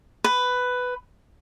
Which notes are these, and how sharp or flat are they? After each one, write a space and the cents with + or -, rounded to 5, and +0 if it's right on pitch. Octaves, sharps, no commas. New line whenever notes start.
B4 +10